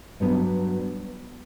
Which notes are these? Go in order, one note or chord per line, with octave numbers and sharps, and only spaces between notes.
G2 F#3 B3 D4